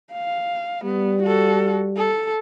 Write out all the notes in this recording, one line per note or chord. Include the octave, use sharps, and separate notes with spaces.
F5
G3 B3
F#4 A4
A4